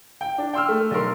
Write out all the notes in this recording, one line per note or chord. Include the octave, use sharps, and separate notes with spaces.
G5
D4
G5 C6 E6 F6
A3
B1 A#4 C6